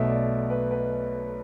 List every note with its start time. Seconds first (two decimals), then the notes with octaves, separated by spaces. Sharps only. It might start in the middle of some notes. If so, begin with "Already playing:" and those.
Already playing: B1 B2 A3 E5
0.08 D5
0.50 B4
0.71 B4